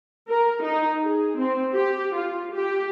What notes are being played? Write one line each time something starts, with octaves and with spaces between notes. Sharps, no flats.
A#4
D#4
G#4
C4
G4
F4
G4